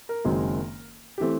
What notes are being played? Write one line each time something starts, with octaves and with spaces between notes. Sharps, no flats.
A#4
F#1 F#2 D#3 G#3 C4
E3 A3 C4 G4